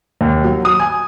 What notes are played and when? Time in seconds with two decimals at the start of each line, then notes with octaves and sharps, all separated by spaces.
0.21 D#2
0.44 F#3
0.65 D#6
0.80 G#5